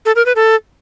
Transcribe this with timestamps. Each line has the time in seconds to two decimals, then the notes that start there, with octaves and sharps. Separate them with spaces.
0.06 A4
0.16 A#4
0.26 B4
0.36 A4